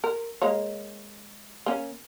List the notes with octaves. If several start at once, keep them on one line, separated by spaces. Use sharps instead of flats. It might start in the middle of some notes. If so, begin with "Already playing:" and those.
A#4
G#3 A#3 C#5
A#3 C#4